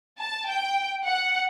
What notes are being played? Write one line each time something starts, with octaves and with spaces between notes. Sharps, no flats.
A5
G5
F#5